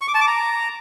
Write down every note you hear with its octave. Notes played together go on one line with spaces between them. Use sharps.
C#6
D6
A5
D6
A#5